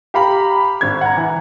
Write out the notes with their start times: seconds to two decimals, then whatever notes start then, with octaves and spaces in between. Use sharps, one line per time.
0.14 G4 F5 A#5 B5
0.81 G#1 G#6
1.01 F#5 A#5
1.17 E3